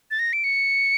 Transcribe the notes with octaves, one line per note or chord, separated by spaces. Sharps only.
A6
A#6
D7
C#7